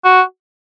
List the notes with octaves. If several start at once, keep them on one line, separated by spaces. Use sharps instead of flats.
F#4